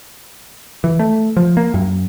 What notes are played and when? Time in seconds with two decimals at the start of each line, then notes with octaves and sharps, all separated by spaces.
0.84 E3
0.99 A3
1.37 F3
1.57 A#3
1.74 F#2